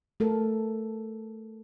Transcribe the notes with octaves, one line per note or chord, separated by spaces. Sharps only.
A3 A4 A#4